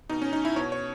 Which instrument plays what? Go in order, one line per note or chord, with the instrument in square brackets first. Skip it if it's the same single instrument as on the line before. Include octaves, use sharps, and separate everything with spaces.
[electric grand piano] B2 D#4
C#4
D#4
E4
B2 C#5
C#5